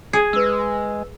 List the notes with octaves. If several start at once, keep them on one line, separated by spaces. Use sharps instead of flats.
G#4 G#6
G#3 B4 E6